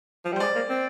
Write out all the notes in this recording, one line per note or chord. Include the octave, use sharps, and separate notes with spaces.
F3
G3
C5
G#3 D5
A#3
C4